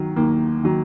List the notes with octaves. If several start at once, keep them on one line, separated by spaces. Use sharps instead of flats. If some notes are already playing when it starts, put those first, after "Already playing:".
Already playing: D#3 F#3
D#2 A#3
D#3 F#3